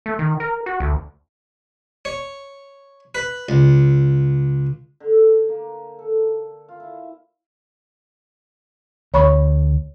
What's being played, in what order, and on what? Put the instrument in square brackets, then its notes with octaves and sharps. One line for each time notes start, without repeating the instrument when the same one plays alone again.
[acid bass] A3
D#3
A#4
F#4
D2
[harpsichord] C#5
B4
C#2
[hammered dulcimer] D3
A#3
A4
F4
E4
[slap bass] D2 [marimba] C#5 B5 C#6